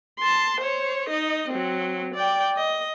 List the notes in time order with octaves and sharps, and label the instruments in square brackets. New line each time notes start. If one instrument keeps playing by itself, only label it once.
[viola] A5 C6
C5 C#5
D#4 D#5
F#3 C4
D5 G5
D#5